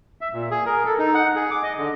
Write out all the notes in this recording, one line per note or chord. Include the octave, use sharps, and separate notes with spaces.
E5
A#2
G#4
A#4
A4
D#4
F#5
G#4
D6
D#5
D3